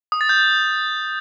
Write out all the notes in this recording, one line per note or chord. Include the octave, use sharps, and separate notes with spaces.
D#6
A6
G6